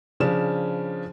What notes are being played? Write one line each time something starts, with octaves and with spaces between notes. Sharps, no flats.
C#3 F3 D4 E7